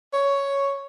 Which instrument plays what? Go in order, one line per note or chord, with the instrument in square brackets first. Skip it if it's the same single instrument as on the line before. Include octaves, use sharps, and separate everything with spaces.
[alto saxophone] C#5